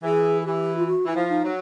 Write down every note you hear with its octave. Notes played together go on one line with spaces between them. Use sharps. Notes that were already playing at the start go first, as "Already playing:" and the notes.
E3 G#4
G#4
E3 G4
F4
F#4
E3 E4
F3
D#4
F#3